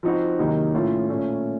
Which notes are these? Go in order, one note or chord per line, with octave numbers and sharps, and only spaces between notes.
F3 C4 D#4 F#4
C3 D#3 F#3 A#3 D#4
A2 A3 C#4 F4
A#2 A3 C#4